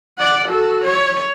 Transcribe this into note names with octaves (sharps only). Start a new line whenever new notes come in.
D5 F#5
F#4 A4
C#5